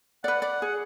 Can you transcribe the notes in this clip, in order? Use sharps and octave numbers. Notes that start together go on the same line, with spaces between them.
B4 D5 F#5
D5
G#4